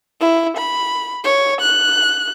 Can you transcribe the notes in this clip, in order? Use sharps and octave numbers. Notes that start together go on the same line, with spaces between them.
E4
B5
C#5
F#6